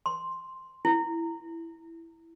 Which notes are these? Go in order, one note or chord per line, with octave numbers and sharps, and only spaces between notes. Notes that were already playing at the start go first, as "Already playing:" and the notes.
C6
E4